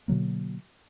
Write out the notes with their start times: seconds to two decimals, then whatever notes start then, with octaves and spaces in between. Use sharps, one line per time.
0.08 B2 D3 F#3 A#3